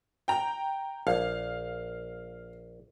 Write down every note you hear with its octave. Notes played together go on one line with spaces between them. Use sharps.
G5 A#5
A#1 F5